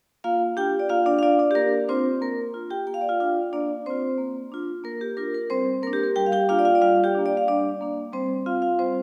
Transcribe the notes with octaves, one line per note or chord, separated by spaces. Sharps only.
A#3 F4 F5
D4 F4 G4 G5
D5
A#3 F4 F5
D4 D5
F5
D4 F4 D5
D4 D5
G4
A#3 A#4
C4 D4 F4 C5
A#3 A#4
D4 F4
G4 G5
A#3 G5
F5
D5
F4 F5
D4 F4 F5
A#3 D4 D5
C4 D4 F4 C5
A#3
D4 F4
A#3 A#4
G4
D4 F4 A#4
A#4
G3 C4 C5
A#3 D4 A#4
G4
A#4
G3 G4 G5
F5
G4 G5
A#3 D4 F4 F5
D5
F4 F5
D5
G3 F4 F5
G4 G5
A#3 D4
D5
F5
G3 D4 D5
A#3 D4
G3 C4 C5
C4 F4 F5
F4 F5
G3 C4 C5